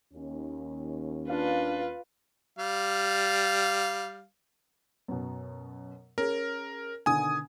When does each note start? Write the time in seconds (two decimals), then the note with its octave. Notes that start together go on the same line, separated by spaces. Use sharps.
0.14 D#2 C#4
1.29 D4 F4 B4 F5
2.59 G3 F5
5.08 F#2 B2
6.18 C#4 G#4 A#4
7.06 B2 D3 D#3 G#5 D#6